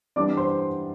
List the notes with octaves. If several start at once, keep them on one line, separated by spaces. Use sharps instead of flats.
E3 G3 D4 D5 D6
C5 C6